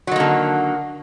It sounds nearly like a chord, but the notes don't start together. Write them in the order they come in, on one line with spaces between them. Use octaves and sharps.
F#3 D#3 A#3 D3